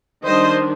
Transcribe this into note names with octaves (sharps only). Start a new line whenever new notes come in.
D#3 G3 D4 C5 D#5